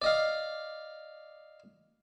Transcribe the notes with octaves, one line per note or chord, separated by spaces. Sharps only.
D5 D#5 F5